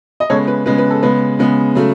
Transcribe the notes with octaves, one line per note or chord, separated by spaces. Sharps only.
D#5
C#3 G#3 B3 A4 C#5
B4
C#3 G#3 B3 B4
B4
A4
C#3 G#3 B3 B4
C#3 G#3 B3
C#3 F#3 A3